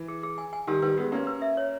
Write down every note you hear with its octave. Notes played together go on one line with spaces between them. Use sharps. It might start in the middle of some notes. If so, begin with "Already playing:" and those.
Already playing: E3
G#4
G#4
G#5
G#5
D#3 G3 G4
D#3 G3 B4
G#3 B3 G4
A#3 C#4 G4
B4
E5
C#5